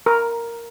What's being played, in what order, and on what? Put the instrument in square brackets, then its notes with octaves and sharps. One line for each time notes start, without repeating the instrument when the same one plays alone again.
[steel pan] A#4